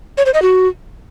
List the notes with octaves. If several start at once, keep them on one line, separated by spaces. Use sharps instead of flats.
C#5
C5
D#5
F#4